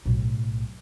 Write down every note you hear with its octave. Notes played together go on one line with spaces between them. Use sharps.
B1 A2